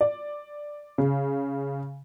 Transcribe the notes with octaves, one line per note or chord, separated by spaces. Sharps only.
D5
C#3